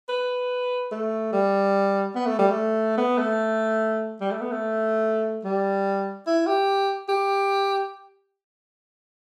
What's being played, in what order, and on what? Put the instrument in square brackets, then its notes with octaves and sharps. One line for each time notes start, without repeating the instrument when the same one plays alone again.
[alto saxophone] B4
A3
G3
B3
A3
G3
A3
B3
A3
G3
A3
B3
A3
G3
E4
G4
G4